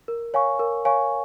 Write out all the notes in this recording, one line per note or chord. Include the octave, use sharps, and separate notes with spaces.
A#4
C#5 F5 G#5 C#6
A#4
C#5 F5 G#5 C#6